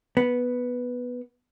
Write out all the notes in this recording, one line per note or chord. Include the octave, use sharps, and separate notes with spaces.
B3